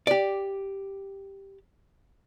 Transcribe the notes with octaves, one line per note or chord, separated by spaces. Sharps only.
G4 D5